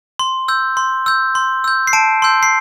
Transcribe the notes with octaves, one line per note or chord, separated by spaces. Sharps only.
C6
E6 G6
C6
E6 G6
C6
E6 G6
C7
A5 D7
C6 E6 G6
C7